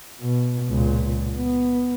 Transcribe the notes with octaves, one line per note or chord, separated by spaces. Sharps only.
B2
C#2 A#2
B3